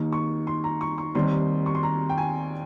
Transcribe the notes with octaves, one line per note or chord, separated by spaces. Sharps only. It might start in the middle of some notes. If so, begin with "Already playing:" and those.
Already playing: D#2 D#3 A#3 D#4
C#6
C6
A#5
C#6
C#6
D#2 D#3 G3 C4 D#4 C6
C#6
C6
A#5
G5
G#5